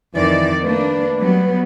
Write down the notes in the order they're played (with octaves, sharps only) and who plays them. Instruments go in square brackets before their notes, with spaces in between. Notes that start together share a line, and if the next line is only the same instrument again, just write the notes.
[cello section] F2 D#3 D5 [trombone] E3
[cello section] A3 A#3 D4 [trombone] B4
[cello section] F#3 G3 B3